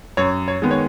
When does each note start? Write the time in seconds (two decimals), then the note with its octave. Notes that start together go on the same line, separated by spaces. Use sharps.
0.17 F#2 C#5
0.48 C#5
0.62 D#3 G#3 B3
0.71 C#5